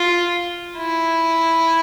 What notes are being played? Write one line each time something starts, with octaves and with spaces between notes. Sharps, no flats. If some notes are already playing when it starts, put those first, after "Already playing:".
Already playing: F4
E4